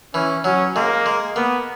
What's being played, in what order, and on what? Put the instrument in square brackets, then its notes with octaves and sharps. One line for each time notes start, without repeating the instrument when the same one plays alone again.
[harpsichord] E3 [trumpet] C#4
[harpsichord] F#3 [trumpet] C#4
[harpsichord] G#3 [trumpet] A#3
[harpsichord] G#3
[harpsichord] A#3 [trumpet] B3